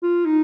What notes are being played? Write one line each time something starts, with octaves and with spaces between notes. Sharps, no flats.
F4
D#4